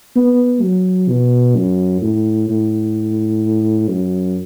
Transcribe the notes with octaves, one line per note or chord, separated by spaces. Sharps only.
B3
F#3
B2
F#2
A2
A2
F#2